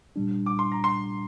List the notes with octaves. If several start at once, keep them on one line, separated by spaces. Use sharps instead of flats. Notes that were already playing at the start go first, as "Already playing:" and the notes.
A#2 G3 D4
D6
C6
A#5
C6